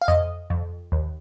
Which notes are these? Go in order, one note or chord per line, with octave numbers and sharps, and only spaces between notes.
F5
F2 D#5
F2
D#2